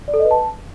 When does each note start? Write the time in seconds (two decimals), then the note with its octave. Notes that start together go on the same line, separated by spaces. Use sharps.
0.08 D5
0.14 A4
0.19 D#5
0.25 B4
0.31 A5